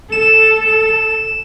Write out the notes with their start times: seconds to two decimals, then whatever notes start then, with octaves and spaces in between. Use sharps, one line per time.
0.12 A4 E7